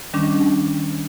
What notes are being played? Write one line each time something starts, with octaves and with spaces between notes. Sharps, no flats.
D#3 G3 C#4 D4